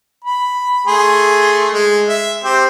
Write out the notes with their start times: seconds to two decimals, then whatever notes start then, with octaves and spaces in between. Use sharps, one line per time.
0.24 B5
0.87 A3 G#4 C6
1.73 G#3
2.09 E5
2.44 C4 G4 C5